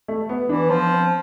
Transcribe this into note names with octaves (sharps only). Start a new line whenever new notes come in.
A3
B3
E3 D4
F3 B3
C4